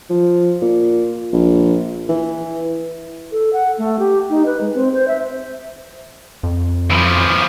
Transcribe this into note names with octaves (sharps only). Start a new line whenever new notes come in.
F3
A#2
A#1
E3
A4
F#5
A3
G4
D#4
B4
G#3
C4
C5
E5
F2
E3 F3